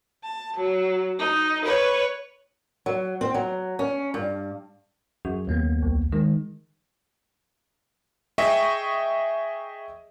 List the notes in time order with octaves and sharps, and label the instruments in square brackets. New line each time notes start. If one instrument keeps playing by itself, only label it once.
[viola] A5
F#3
D#4
B4 C#5
[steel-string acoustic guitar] F#3
C4
F#3
C#4
G2
[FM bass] F#2 [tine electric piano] G#4
[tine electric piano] D#2 A#3 B3
[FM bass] C2
[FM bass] D#3 [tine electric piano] G#3
[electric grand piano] G#4 D#5 E5 G5 C#6 D#6